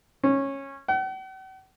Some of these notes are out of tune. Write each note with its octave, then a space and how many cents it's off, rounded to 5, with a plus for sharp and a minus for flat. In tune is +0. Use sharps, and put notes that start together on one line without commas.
C#4 -15
F#5 +45